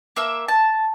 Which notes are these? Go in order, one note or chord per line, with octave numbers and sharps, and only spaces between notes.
A#3 E5 E6
A5